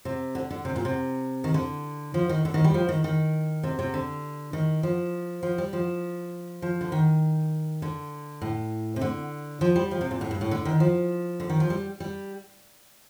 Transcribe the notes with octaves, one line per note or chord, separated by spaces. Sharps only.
C3
D3
D3
C3
A#2
C3
D#3
D3
F3
D#3
D3
D#3
G3
F3
D#3
D#3
C3
C3
D3
D#3
F3
F3
G3
F3
F3
D3
D#3
D3
A2
C3
D3
F3
G3
F3
C3
A#2
A2
G2
A2
D3
D#3
F3
D3
D#3
F3
G3
G3